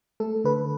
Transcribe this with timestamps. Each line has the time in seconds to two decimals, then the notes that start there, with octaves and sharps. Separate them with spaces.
0.20 A3 A4
0.44 D3 B4